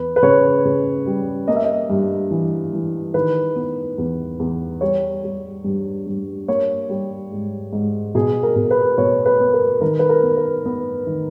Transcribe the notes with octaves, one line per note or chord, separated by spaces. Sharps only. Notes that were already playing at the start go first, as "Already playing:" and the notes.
Already playing: E2 B4
B4
C#3 C#5
C#3
G3
A#3 D#5
E5
D#5
G2
E3
E3
D#3 B4
B3
E2
E2
G3 C#5
G3
G2
G2
A#3 C#5
G3
G#2
G#2
B2 G#4
A#4
B2
B4
B2 C#5
B4
B3
A#4
D#3 A#4
B4
A#4
B3
B4
B3
D#3